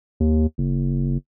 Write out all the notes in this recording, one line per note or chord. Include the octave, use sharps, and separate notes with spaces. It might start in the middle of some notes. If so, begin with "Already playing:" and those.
D#2
F#1